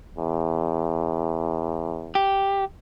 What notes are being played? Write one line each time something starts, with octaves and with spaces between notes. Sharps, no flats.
E2
G4